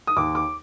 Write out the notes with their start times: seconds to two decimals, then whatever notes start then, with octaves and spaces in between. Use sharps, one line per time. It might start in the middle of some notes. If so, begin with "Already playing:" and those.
0.07 D#6
0.16 D#2 D6
0.35 D6